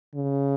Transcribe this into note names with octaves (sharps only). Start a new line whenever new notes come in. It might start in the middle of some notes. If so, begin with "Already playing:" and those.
C#3